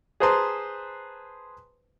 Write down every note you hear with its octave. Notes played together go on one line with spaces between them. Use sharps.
G#4 B4 C5 A5 A#5 C6